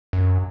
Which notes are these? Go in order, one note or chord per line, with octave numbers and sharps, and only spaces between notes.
F#2